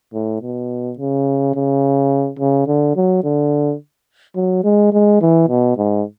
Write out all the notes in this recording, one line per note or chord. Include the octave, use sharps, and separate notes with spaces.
A2
B2
C#3
C#3
C#3
D3
F#3
D3
F#3
G#3
G#3
E3
B2
G#2